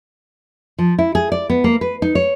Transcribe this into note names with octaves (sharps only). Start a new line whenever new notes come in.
F3
E4
G#4
D5
B3
A#3
B4
D#4
C#5